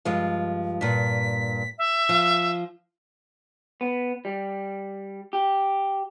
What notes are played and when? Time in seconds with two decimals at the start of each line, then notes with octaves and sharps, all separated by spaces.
0.05 G2 F3 G#3
0.81 G2 A#2 B6
1.78 E5
2.09 F3
3.81 B3
4.25 G3
5.33 G4